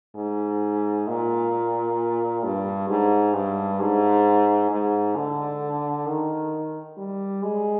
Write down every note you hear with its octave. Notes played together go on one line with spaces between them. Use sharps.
G#2
A#2
G2
G#2
G2
G#2
G#2
D3
D#3
G3
G#3